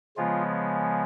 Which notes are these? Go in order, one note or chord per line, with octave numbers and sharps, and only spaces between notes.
C#3 F3 G#3 B3 F4